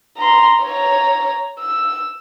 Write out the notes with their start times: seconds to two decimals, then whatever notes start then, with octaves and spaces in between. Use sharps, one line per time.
0.18 A#5 C6
0.62 C#5 A#5
1.60 E6